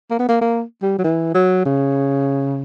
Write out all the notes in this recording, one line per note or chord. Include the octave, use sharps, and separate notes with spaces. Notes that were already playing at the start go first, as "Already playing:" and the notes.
A#3
B3
A#3
A#3
G3
F#3
E3
F#3
C#3